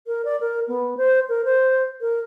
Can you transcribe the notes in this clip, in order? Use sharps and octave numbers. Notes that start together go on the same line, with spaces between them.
A#4
D5
A#4
B3
C5
A#4
C5
A#4